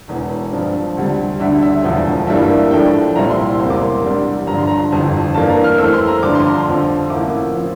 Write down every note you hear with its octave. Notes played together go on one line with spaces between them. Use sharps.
E1 E2 E3
G2 F3 C4
D2 C3 G3
D2 D3 G3 D4 E5
E5
E1 E2 D3 F3
G2 E3 G3 A#3 E4 E5
A2 F3 A3 D4 G5
C2 A#2 G3 C4 E4 A#5
C6
E1 E2 C3 G3 A#3 C6
D6
C6
C2 C3 G3 D4
G1 G2 F3 A#5
C6
A#5
G1 F2 C3 E3
G2 E3 A#3 A5
A#5
F6
F2 E3 A3 C4 E6
C6
A#5
G2 D3 F3 D6
C6
A#5
C6
F2 D3 F3
A1 A2 F3 A#3 E4 D6
F3 C4